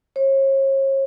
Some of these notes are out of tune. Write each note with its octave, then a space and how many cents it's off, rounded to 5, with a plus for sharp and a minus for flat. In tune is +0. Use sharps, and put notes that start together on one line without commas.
C#5 -40